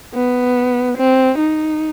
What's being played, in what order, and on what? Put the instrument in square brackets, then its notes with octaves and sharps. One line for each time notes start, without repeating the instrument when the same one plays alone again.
[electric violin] B3
C4
D#4